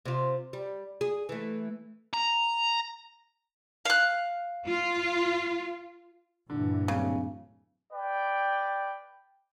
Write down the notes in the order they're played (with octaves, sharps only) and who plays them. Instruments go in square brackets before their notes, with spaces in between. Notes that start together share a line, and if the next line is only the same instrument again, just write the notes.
[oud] C3 F4
G3
G#4
E3 A3
[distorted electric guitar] A#5
[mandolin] F5 F#6
[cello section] F4
[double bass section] G2 A#2 E3 [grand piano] D3
[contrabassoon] D1 [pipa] C#3
[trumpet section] B4 D5 G5